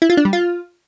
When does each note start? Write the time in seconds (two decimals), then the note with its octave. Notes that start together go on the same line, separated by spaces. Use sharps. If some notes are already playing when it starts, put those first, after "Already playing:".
0.02 E4
0.10 F4
0.17 D4
0.25 G3
0.33 F4